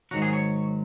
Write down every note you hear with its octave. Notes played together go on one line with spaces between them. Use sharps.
G#2 D#3 F#3 F#4
G#4
C#5